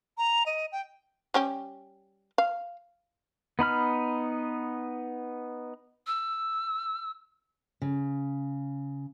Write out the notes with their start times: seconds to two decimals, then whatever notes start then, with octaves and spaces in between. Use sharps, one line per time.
0.18 A#5
0.46 D#5
0.72 G5
1.34 G3 C#4 G4
2.38 F5
3.59 B3 D#4 B5 F6
6.07 E6
7.82 C#3